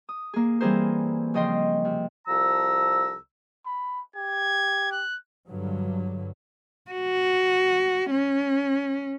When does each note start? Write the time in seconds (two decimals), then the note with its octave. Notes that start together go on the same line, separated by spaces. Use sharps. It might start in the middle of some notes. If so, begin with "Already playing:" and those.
0.09 D#6
0.34 A#3 G#4
0.61 E3 G3 C4 G#4 A#4 C5
1.34 C#3 F3 D#5 G5 C6
1.85 C3
2.28 C2 F3 A4 A#5 E6
3.66 B5
4.16 G4 G#6
4.92 F#6
5.48 G2 D3 F#3
6.91 F#4
8.11 C#4